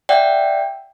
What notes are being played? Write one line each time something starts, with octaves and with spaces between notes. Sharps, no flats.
D5 E5 F#5 G5